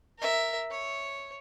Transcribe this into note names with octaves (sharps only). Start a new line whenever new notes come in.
A#4 E5
C#5